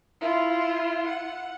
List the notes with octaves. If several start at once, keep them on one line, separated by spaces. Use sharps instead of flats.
E4 F4
F#5